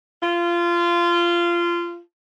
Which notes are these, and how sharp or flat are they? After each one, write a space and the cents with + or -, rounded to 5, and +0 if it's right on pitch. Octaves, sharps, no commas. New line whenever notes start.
F4 -20